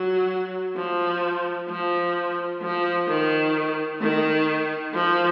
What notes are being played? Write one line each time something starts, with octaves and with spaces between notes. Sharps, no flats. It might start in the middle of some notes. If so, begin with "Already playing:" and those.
Already playing: F#3
F3
F3
F3
D#3
D#3
F3